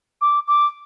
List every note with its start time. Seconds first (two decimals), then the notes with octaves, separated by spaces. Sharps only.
0.21 D6
0.48 D6